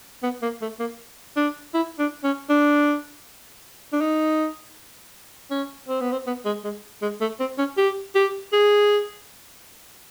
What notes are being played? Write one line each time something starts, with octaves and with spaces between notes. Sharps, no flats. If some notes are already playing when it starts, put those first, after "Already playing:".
B3
A#3
A3
A#3
D4
E4
D4
C#4
D4
D4
D#4
C#4
C4
B3
C4
B3
G#3
G#3
G#3
A3
C4
C#4
G4
G4
G#4